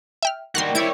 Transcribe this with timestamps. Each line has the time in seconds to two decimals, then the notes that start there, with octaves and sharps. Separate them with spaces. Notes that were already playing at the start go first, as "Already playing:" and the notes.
0.23 E5 G5 F6
0.55 D#3 G3 A#3 F#4 C6 F6 F#6
0.75 G3 C4 E4 C#5 D5 G#6 D7